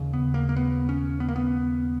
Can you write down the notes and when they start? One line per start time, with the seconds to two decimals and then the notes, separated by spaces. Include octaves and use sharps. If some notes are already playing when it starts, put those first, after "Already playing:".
Already playing: D#2 C#3
0.13 B3
0.34 A#3
0.49 A#3
0.56 B3
0.89 C#4
1.20 B3
1.29 A#3
1.36 B3